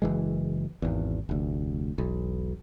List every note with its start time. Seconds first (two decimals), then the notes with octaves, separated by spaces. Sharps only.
0.02 F#1 E3 G#3
0.82 G#1 E2
1.29 F1 D2
1.98 E1 B1